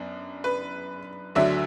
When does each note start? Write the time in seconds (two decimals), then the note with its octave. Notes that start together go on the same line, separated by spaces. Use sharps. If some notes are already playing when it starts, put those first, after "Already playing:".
Already playing: F#2 B3 D4
0.44 B4
1.35 D2 D3 F#3 D4 E5